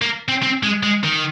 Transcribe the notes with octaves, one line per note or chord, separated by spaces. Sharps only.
A#3
C4
C4
G#3
G#3
D#3